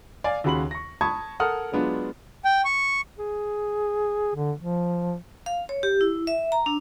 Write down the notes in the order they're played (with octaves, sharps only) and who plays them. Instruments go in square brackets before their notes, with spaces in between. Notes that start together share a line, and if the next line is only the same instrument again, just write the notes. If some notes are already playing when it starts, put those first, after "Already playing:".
[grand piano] D5 F5 G#5
D#2 C#3 F#4 B5 C6 F#7
C#6 A#6
A5 B5 C#6 D#6 G#6
A4 A#4 F#5 D#6 F6
F#3 G#3 B3 D4 F4
[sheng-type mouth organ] G5
C#6
[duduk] G#4
D3
F3
[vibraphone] F5
C#5
G4
E4
E5
A#5
D4